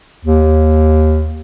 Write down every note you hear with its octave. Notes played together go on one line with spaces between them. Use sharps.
D#2